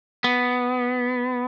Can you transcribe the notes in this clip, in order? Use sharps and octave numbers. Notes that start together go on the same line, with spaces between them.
B3